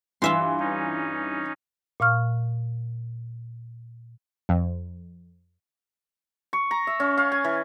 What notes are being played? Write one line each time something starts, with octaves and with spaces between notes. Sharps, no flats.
G2 E3 F4 E5 C6
C#4 D#4
A#2 F5 C#6 F6
F2
C#6
A#5
E5
C#4
F5
G#5
E3